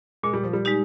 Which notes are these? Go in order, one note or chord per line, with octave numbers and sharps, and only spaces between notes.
A#2 G#3
G3
F3
G3
G#3 D#4 G4